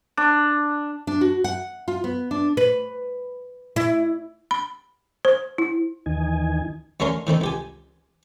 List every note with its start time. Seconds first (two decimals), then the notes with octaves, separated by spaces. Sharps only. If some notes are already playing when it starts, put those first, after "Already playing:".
0.17 D4
1.07 D4
1.21 F#4
1.44 F#5
1.88 F4
2.04 B3
2.31 D4
2.57 B4
3.76 E4
4.51 B5
5.25 C5
5.58 E4
6.06 D#2 D#3 E3 D#4 G#5
7.00 D2 D3 A3 C#4 A#4 C6
7.27 A2 D#3 C4 D#4
7.41 C#2 G4 G#5